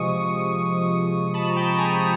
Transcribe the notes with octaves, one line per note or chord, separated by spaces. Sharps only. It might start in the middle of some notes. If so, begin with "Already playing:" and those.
Already playing: C3 F3 G#3 C#6 D#6
A5 B5
A#5
G5 A5
G#5 A#5
A#5